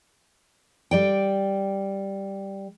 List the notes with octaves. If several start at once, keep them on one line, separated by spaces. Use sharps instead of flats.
G3 D5 G5